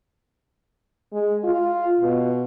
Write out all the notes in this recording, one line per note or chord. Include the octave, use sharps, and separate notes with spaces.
G#3
F4
B2